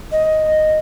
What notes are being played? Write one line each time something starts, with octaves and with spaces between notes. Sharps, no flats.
D#5